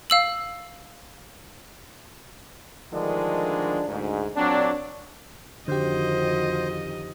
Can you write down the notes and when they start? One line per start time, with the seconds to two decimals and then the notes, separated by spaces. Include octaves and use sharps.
0.10 F5 E6 F#7
2.93 D3 D#3 F3 G#3 A3 D4
3.88 D2 G#2
4.37 A#2 F#3 C4 D4
5.68 F2 D3 D#3 F#4 G4 C5 D#5